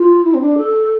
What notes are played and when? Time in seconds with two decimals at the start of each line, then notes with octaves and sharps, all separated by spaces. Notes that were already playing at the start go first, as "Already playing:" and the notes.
Already playing: F4
0.25 E4
0.34 C4
0.41 D4
0.58 A4